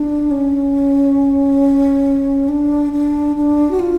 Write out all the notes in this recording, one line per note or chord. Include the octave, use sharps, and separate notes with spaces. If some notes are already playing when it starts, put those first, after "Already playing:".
Already playing: D4
C#4
D4
D4
D4
F#4
F4